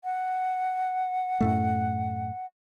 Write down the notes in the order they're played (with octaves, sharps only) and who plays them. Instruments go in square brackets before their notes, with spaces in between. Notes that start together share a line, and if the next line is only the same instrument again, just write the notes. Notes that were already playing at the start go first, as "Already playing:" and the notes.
[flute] F#5
[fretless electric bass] F#2 A2 A3